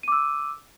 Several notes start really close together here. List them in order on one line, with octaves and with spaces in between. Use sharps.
D#7 D6 E6